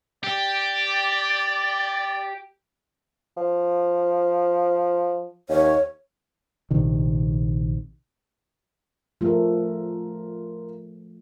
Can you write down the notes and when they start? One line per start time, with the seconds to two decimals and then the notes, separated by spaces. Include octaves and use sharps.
0.24 G4 D5
3.37 F3
5.49 D#2 C#5
6.71 A#1 C3 D#3
9.21 F3 A3 F4 A#4